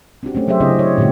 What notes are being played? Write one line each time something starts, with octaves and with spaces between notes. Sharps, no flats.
C4 D4 F#4 G4
A3 C4 C#4
F#3 G4 G#4 C5 E5
C#3 C4 D4 E4 G#4 D#5
C#5
A#2 D3 G#3 F#4 G4